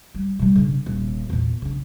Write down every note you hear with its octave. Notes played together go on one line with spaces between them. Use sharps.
G3
B2 G3
C#3 D4
D#1
E2 A#2
C#3 D4